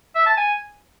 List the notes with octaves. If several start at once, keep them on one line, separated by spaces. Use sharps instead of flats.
E5
A5
G#5